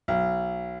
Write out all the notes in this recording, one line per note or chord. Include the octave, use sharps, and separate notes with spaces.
B1